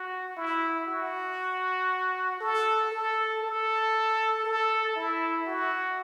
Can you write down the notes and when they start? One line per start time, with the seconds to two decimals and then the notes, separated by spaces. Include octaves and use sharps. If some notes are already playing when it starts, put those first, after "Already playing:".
Already playing: F#4
0.37 E4
0.87 F#4
2.40 A4
2.92 A4
3.42 A4
4.45 A4
4.96 E4
5.46 F#4